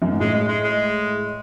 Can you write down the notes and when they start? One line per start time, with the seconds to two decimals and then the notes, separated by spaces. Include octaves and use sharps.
0.02 F#2
0.11 G#2
0.20 A2 G#3
0.34 G#3
0.48 G#3
0.63 G#3